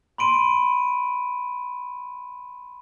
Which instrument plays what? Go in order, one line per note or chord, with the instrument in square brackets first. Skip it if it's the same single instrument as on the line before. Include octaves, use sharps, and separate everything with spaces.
[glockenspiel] B5 C6 D7 D#7